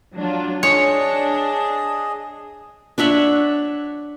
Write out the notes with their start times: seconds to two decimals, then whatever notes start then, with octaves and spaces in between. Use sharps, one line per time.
0.15 F#3 D4 F4
0.63 D4 G#4 C#5 D#5
2.98 D4 C#5 E5 F#5